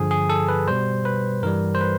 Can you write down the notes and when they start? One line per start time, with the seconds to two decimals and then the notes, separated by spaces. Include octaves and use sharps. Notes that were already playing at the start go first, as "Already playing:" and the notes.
Already playing: G2 D3 F3 G#4
0.11 G#4
0.30 A4
0.49 B4
0.68 B2 G3 C5
1.05 B4
1.43 G2 E3 G3 A#4
1.75 C5
1.81 B4